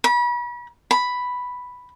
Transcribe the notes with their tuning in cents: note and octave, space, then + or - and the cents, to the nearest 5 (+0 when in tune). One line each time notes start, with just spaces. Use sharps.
B5 -35
B5 +0